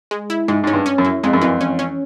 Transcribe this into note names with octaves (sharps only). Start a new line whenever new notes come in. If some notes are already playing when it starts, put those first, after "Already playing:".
G#3
E4
G#2 G#3
G#2 C#4
G2
C#4
F#2
E4
F2 G#3
F#2
F2 E3
C#4
C#4